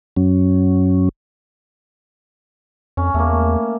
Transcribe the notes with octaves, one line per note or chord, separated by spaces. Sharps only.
F#2 F#3 C#4
F2 C#4
E2 A3 A#3